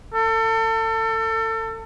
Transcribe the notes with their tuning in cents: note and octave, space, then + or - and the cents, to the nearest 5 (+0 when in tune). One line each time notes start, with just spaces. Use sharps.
A4 +30